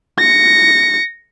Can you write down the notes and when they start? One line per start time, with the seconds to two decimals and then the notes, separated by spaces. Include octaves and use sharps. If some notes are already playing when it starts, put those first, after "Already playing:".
0.19 A#6 C#7